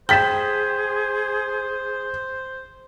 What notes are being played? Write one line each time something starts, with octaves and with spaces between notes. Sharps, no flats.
G#4 C5 G5 G6 A6 B6 E7